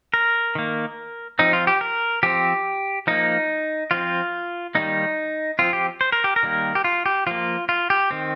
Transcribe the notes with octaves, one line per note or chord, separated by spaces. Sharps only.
A#4
D#3 A#3
F3 C4 D#4
F4
G4
A#4
F3 C4 G4
F3 A#3 D#4
F3 C4 F4
D#3 G3 A#3 D#4
F3 C4 F4
G4
C5
A#4
G4
A#4
D#3 G3 A#3
G4
F4
G4
F3 A#3 F4
F4
G4
D#3 C4